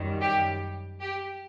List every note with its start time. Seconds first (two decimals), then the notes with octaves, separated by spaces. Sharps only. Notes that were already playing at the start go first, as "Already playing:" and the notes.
Already playing: F#2 D#3 G3
0.20 G4
1.00 G4